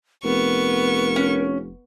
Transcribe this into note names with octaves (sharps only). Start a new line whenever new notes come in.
F1 B3 A#4 C#6
C#4